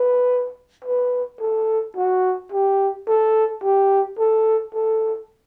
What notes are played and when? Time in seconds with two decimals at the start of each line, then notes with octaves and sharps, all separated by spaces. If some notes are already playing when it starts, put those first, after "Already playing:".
Already playing: B4
0.84 B4
1.40 A4
1.96 F#4
2.52 G4
3.08 A4
3.63 G4
4.19 A4
4.74 A4